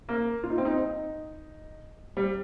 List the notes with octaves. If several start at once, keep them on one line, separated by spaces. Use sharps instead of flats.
A#3
F4
D#4
C4
D#4
D#4
G3